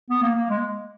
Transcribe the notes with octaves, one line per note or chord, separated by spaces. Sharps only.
B3
A#3
A#3
G#3